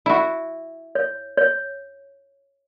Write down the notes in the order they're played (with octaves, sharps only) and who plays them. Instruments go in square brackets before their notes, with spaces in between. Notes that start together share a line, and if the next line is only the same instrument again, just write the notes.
[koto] E4 F#4
[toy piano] C#5
C#5